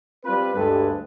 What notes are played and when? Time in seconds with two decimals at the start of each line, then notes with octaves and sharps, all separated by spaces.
0.25 G3 C4 F4 B4
0.55 D2 G2 G#3 G4 A4 B4